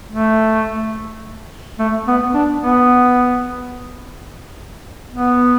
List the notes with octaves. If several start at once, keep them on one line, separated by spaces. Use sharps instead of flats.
A3
A3
B3
D4
B3
B3